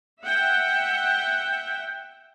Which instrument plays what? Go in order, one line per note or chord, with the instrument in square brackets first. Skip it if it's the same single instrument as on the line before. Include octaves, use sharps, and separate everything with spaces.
[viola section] E5 F#5 G5